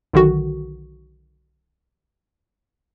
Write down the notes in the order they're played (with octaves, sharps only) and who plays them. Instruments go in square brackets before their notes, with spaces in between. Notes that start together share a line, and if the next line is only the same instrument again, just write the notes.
[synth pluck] B1 D3 D#3 F#4